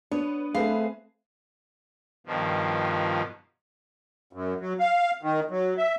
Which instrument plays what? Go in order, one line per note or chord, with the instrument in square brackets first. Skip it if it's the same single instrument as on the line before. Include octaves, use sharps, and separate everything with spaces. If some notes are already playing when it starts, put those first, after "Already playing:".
[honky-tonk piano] B3 [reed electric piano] D4 [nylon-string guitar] C#5
[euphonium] A3 [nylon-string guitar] C4 F5 [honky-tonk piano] G#4 B4
[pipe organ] G2 B2 D#3 F3
[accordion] F#2
F#3
F5
D#3
F#3
E5